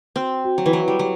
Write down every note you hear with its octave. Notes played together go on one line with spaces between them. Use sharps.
C4 F#4
F#4
F#3
E3
F#3 B4
G3
F#3 G4